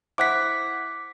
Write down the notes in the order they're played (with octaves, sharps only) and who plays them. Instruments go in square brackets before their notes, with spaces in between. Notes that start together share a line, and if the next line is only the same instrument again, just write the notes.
[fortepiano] E4 C5 F#5 [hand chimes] D6 B6